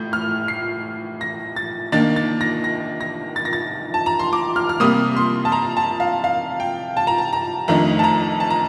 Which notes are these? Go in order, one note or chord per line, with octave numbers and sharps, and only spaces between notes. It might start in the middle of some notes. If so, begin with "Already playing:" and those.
Already playing: A2 G6
F6
C7
A#6
A6
D#3 A#3 D4 A6
A6
A#6
A#6
A#6
A6
A#6
A6
A5
A#5
C6
D6
F6
F6
C3 G3 A#3 D#6
C6
A5
A#5
A5
F5
F5
G5
A5
A#5
A5
A#5
F2 D#3 A3 D4 A#5
A5
A#5
A5
A#5